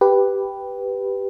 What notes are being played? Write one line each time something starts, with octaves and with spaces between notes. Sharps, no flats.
G4 B4